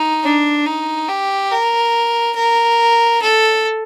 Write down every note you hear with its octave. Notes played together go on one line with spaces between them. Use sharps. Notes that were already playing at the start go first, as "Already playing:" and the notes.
Already playing: D#4
D4
D#4
G4
A#4
A#4
A4